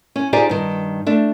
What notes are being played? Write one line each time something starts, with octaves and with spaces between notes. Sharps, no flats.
C#4
D#4 F4 G4 G#4 C5 D5
G2 D#3
A3 D4